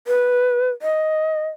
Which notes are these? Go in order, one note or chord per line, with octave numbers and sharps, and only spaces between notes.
B4
D#5